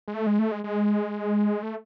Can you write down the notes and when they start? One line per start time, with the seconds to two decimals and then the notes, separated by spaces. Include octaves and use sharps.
0.08 G#3
0.14 A3
0.27 G#3
0.39 A3
0.52 G#3
0.64 G#3
1.63 A3